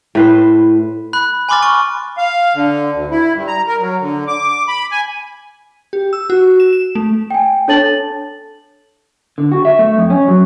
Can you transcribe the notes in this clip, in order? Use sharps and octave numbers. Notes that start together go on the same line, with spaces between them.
A2 B4 C5
B5 F#6
G#5 B5 C6 D6 F6 A6
G#5 C#6
F5
D3
D2
E4
G2
A#5
A#4
F#3
D3
D6
B5
G#5
G4
E6
F#4
E7
E7
A3
G5 G#5
D4 A4 C#5 A5 A6 F#7
D3
F#4
E5
A3
F2
C#4
F#3